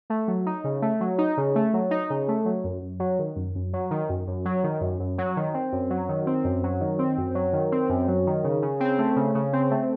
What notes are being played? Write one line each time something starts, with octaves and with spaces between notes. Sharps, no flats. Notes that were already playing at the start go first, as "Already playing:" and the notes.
A3
F#3
D#4
C#3
A3
F#3
D#4
C#3
A3
F#3
D#4
C#3
A3
F#3
F#2
F#2
F#3
D#3
F#2
F#2
F#3
D#3
F#2
F#2
F#3
D#3
F#2
F#2
F#3
D#3
C4
F#2
F#3
D#3
C4
F#2
F#3
D#3
C4
F#2
F#3
D#3
C4
F#2
F#3
D#3
C#3
C#3
C4
A3
C#3
C#3
C4
A3